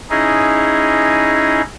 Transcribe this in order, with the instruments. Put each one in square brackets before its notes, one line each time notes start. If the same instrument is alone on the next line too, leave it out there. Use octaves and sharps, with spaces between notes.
[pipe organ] C#4 D#4 E4 G#4 D#5